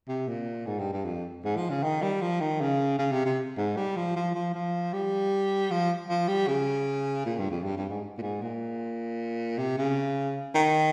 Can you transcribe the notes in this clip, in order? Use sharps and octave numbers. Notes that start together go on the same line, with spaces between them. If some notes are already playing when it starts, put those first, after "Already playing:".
C3
A#2
G#2
G2
G2
F2
G#2
F3
C#3
D#3
G3
F3
D#3
C#3
C#3
C3
C3
G#2
G3
F3
F3
F3
F3
G3
F3
F3
G3
C#3
A#2
G2
F2
G2
G2
G#2
A#2
G#2
A#2
C3
C#3
D#3